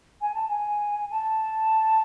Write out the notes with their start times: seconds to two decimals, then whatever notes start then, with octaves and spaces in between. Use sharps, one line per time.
0.21 G#5
0.34 A5
0.49 G#5
1.11 A5